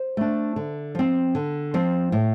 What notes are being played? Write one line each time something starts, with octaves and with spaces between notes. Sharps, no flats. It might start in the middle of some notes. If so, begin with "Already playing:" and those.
Already playing: C5
A3 D4
D3
F3 C4
D3
F3 C4
A2